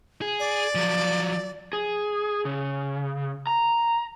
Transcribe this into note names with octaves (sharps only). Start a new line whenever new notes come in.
G#4
D5
F3 F#3
G#4
C#3
A#5